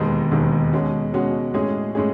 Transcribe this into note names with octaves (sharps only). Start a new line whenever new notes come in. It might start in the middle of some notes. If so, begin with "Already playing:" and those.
Already playing: E1 D#2 D#3 G#3
E1 D#2 D#3 G#3
B2 G#3 C#4 F#4
B2 G#3 C#4 F#4
A2 G#3 C#4 G#4
A2 G#3 C#4 G#4